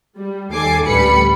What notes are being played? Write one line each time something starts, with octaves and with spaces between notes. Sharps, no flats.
G3
D#2 A4 G#5 D6 C7
A1 D2 G3 B4 B5 C#7